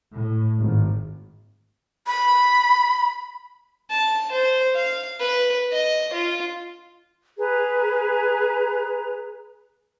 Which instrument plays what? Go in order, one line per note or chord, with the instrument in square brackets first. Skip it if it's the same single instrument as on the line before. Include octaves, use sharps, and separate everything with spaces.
[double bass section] A2
G#1
[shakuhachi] B5
[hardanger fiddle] A5
C5
F5
B4
D#5
F4
[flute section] G#4 B4 A#5